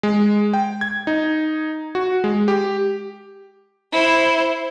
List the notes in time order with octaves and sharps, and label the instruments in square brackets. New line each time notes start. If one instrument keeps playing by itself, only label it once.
[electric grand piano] G#3
G5
G#6
D#4
F#4
G#3
G4
[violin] E4 C5